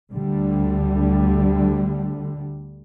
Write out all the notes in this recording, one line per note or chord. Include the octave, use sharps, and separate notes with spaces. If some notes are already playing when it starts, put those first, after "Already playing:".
D2 D3 G3